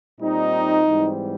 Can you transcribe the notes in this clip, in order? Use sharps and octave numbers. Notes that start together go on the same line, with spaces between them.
A#2 G3 C4 D#4
G#2 E3 G3 C4